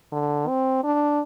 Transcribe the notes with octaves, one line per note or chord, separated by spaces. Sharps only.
D3
C4
D4